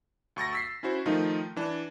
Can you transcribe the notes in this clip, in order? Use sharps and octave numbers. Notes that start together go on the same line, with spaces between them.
D2 C#6 A6 A#6
E6 B6 C7
C#4 E4 F#4 C5
D#3 F3 A3 D#4 F4
E3 D4